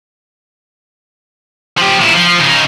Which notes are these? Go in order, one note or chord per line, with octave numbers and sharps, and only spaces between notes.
F3 G4
A#2 E4
F3
C#3 D#4